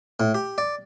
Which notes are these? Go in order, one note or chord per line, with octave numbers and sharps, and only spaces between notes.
A2
G4
D5